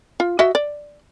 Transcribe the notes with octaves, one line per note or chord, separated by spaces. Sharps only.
F4
F#4 D#5 E5
D5